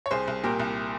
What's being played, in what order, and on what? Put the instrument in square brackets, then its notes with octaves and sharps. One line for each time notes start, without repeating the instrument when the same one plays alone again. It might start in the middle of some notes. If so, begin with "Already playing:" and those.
[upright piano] C#5
C2 G#4 C5
C2
A#2 G4 A#4
C2